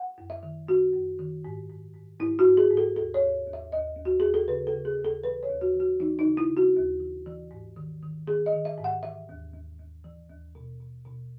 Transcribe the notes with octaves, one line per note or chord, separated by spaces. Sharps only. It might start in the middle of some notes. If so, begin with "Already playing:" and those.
Already playing: F#5
F#2
E5
D#3
F#2 F#4
F#2
D#3
G#2
G#2
G#2
G#2 E4
F#4
G#2
G#4
G#2
A4
D#2 A4
C#5
D#2
D#2
E5
D#2 D#5
D#2
F#4
D#2 G#4
A4
C#3 B4
A4
C#3
G#4
D#2
A4
E3 B4
C#5
D#2
F#4
E3
F#4
E3 D#4
D#4
C#3
E4
C#3
F#4
D#2
E3
E3
G#2
D#3
D#3
D#3 G#4
D#5
D#3
E5
G#2
F#5
E3 E5
D#2
D#2
D#2
E3
D#2
B2
B2
B2